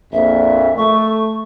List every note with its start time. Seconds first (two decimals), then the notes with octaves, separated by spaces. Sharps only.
0.13 A#1 F2 A#2 E5
0.77 A3 C#6